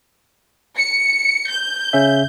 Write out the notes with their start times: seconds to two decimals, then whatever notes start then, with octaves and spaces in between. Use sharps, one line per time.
0.76 C#7
1.49 G6
1.93 C#3 C#4 E5